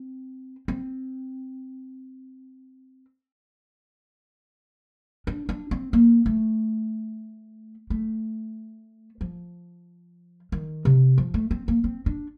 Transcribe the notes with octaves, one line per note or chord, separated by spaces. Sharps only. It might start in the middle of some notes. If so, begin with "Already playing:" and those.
Already playing: C4
C4
D4
D4
C4
A#3
A3
A3
F3
D#3
C3
F3
A3
C4
A#3
C4
D4